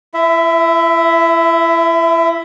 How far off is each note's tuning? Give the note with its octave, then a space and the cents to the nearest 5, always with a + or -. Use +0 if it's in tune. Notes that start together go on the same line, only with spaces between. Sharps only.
E4 +35 E5 +0